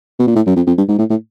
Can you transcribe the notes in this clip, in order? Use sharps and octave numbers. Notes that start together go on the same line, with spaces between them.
B2
A#2
A2
F#2
F2
F2
G2
G#2
A2
A2